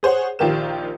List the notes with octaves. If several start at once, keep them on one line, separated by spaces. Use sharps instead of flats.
G#4 C5 C#5 F#5
A#1 D#3 F4 G4 A#4 E7